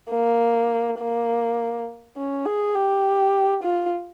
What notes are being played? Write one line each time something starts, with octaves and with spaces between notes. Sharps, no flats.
A#3
A#3
C#4
G#4
G4
F4